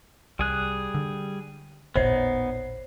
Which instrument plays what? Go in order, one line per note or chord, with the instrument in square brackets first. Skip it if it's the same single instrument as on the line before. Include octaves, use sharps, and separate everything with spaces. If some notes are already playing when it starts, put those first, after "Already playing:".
[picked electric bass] C2 [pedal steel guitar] G3 G#4 F#6
[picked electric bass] D3
[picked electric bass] E1 A1 A#2 [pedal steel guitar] B3 D#4 [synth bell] C5 C#5 C7